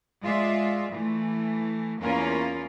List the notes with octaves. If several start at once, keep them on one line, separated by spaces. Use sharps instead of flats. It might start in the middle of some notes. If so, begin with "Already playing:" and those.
G#3 F4 D5 E5
E3 A3
E2 A#3 C#4 E4 F4 A#4